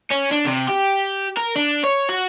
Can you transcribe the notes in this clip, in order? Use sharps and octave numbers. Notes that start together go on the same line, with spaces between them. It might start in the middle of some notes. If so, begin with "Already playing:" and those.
C#4
D4
C3
G4
A#4
D4
C#5
F#4